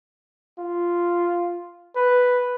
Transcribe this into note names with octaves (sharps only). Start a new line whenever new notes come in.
F4
B4